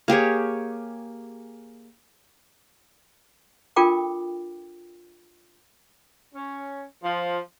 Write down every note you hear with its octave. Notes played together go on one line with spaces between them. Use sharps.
A#3 G4 G#4 C#5
D4 F4 A4 A#4 G5 D6
C#4
F3